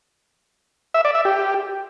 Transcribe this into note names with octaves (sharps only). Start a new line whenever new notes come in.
E5
D5
E5
G4